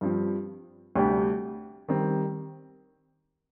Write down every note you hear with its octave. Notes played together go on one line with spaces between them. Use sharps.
G2 F3 C4
D2 C3 G3 D4 G4
D#3 G3 C4